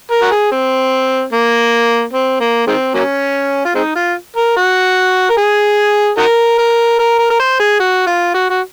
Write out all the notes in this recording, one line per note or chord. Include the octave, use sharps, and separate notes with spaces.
A#4
F#4
G#4
C4
A#3
C4
A#3
D#3 G#3 C4
F#3 A#3 C#4
F4
G#3 C4 D#4
F4
A#4
F#4
A#4
G#4
D#4 F#4 A#4
A#4
A#4
A#4
A#4
C5
G#4
F#4
F4
F#4
F#4